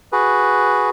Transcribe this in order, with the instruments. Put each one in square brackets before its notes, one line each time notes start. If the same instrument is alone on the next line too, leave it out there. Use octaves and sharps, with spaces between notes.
[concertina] F#4 G#4 B4